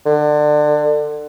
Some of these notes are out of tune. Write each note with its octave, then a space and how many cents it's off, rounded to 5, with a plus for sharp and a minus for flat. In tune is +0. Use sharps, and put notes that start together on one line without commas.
D3 +25